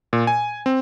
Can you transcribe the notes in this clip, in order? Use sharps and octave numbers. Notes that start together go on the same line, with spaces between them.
A#2
G#5
C4